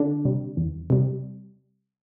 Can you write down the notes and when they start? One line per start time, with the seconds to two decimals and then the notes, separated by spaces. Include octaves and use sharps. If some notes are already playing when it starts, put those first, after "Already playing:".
Already playing: D3 D4
0.25 C3 G3
0.57 E2
0.90 C3 G3